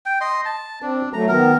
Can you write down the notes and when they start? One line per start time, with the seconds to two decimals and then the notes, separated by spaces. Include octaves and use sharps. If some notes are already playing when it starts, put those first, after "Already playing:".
0.06 G5
0.21 D#5 C6
0.45 A5
0.82 C4 D4
1.13 F#3 A3 A#5
1.28 D#3 B3 A#4